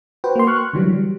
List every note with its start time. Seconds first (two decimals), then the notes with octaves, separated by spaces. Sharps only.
0.24 F#4 B4 C5 G5
0.36 A#3 C6
0.47 C#6 F6 F#6
0.73 D3 E3 F#3 G3
0.93 G3